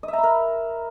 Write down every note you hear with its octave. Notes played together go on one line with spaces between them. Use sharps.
D#5
E5
A#5
B5
A#4